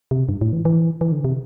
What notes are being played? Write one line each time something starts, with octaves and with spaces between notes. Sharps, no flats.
C3
G2
A2
E3
E3
E3
D3
C3